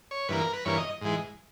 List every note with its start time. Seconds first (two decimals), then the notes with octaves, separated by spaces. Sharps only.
0.11 C#5
0.28 G2 E3 A#3 B4
0.41 A#4
0.53 B4
0.65 G2 E3 A#3 C#5
0.78 D#5
1.01 G#2 E3 G#3